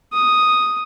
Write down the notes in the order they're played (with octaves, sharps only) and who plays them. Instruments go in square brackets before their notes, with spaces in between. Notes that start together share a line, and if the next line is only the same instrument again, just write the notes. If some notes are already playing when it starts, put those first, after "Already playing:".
[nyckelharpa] D#6